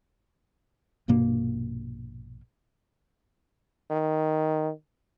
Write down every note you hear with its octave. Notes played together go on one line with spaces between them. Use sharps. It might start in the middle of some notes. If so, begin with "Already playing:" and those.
A#1 G2 B2 A#3
D#3